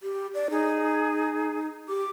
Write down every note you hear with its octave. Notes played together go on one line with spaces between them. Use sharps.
G4
D5
D#4 G#4
G4 D6